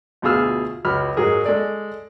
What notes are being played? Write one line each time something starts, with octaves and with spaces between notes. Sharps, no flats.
D2 B2 F4 G#4 E6 F6
C#2 F#3 B5 F6
G#2 F#3 D#4 G#4 A#4
G#3 A4 D5